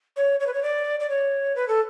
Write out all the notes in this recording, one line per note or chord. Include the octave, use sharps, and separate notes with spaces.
C#5
C#5
B4
C#5
D5
D5
C#5
B4
A4